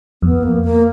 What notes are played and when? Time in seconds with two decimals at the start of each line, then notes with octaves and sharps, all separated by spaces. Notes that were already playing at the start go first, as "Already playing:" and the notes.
0.22 F2 B3
0.43 A#3
0.64 A#3